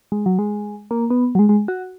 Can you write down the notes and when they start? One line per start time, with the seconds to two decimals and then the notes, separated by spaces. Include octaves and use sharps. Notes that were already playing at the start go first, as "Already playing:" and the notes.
0.12 G#3
0.26 F#3
0.39 G#3
0.91 A#3
1.10 B3
1.35 F#3
1.39 G#3
1.49 G#3
1.68 F#4